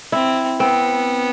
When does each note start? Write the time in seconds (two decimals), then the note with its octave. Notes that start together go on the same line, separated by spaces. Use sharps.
0.12 C4 E4
0.60 B3 C4